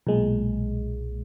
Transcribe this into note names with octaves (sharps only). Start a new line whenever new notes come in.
B1 A#2 G#3